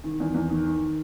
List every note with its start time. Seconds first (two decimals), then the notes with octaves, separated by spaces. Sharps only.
0.04 D#3
0.20 E2
0.34 E2
0.50 D#3
0.66 D#3